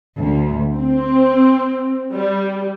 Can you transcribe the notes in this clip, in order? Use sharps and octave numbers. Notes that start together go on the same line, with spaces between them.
D2
C4
G3